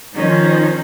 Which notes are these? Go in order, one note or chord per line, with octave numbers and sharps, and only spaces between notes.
D#3 F3 C#4 D#4 C5